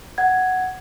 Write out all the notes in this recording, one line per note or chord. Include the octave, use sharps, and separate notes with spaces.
F#5 G#6